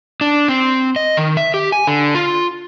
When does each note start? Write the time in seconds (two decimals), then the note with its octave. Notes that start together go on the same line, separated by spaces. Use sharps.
0.21 D4
0.48 C4
0.96 D#5
1.17 D#3
1.37 E5
1.54 G4
1.72 G#5
1.87 D3
2.15 F4